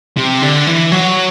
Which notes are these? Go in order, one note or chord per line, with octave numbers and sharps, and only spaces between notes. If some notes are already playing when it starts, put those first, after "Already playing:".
C3
D3
E3
F#3